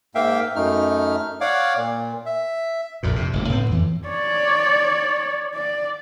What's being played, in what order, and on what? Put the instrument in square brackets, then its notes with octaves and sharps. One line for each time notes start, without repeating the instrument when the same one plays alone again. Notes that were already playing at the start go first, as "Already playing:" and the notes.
[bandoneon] G#2 A#3 E5 F5 G5
F#2 A3 D#4 F6
C#5 D5 F5 F#5 D6
A#2
E5
[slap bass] A#1 F2 A#2
F2 C3
G1 C#2 A#3
A2 B3 C4
F2 E3
[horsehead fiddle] C#5 D5
D5